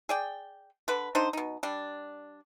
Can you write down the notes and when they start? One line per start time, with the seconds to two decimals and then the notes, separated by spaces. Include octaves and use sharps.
0.09 G#4 D5 G5
0.88 D3 B4
1.15 D3 D4 D#4 C5
1.33 B2 D#4
1.63 G3 D4